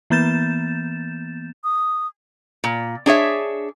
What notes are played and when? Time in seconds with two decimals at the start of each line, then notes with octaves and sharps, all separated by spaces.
0.10 E3 A#3 B3 G6 A6 E7
1.64 D#6
2.64 A#2
3.06 D4 G#4 C#5 E5